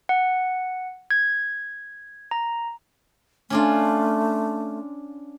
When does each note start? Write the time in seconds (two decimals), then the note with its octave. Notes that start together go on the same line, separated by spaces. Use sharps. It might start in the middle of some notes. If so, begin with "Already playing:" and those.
0.09 F#5
1.11 G#6
2.31 A#5
3.50 A3 C#4 D4 F4